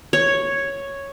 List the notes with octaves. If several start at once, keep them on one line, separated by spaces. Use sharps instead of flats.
C#5